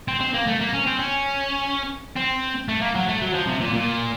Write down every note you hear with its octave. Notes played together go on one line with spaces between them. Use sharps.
C4
C4
A#3
A3
A#3
C#4
C4
C#4
C4
A3
A#3
F#3
A3
F#3
F3
C3
A#2
A#2